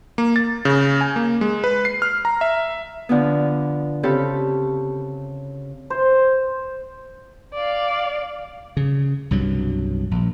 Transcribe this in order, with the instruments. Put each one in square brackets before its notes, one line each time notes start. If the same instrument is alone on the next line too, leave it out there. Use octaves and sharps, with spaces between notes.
[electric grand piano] A#3
A6
C#3
G#5
A#3
G#3
B4
C7
F6
A#5
E5
[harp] D3 F3 B3
C#3 C4 G4 A4 B5
[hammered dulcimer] C5
[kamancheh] D5 F5
[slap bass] C#3
C2 G2 B2 F#3
A#1